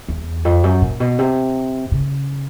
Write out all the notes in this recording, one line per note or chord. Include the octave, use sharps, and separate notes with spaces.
E2
F2
F#2
A#2
B2
C3
C#3